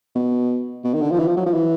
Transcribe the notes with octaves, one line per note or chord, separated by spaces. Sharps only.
B2
B2
D#3
D3
F3
E3
F3
F#3
F3
E3